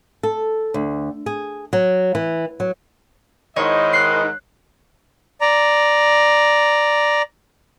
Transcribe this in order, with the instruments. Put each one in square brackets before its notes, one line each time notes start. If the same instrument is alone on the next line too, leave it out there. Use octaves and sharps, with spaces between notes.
[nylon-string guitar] A4
D2
G#4
F#3
E3
F#3
[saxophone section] G#2 D#3 [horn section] E4 C5 D#5 [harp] C#5
[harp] F#6 C7
[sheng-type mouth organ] D5 A#5